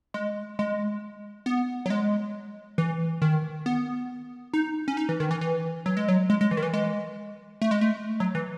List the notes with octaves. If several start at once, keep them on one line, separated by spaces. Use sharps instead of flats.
G#3
G#3
B3
F#3
G#3
E3
D#3
B3
D#4
C#4
D#4
E3
D#3
E3
E3
F#3
G#3
F#3
G#3
G#3
E3
D#3
E3
G#3
A3
G#3
A3
F#3
E3